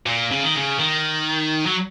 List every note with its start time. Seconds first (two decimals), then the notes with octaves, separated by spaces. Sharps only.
0.06 A#2
0.31 C#3
0.43 D#3
0.55 C#3
0.79 D#3
1.66 F#3